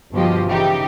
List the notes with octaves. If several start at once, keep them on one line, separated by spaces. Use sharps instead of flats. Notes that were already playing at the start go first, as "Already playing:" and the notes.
G1 B2 F3 F4 G4 D#5
C#3 E3 D#4 G4